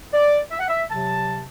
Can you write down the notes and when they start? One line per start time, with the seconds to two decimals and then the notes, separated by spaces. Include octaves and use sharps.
0.13 D5
0.51 E5
0.59 F#5
0.68 E5
0.89 C3 F#3 A5